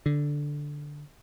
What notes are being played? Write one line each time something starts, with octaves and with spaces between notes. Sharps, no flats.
D3